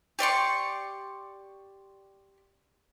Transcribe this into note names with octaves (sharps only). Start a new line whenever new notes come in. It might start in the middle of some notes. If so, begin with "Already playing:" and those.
G4 D5 C6 C#6